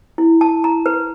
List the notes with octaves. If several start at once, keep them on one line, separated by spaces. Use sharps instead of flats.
E4
A5
A#5
B4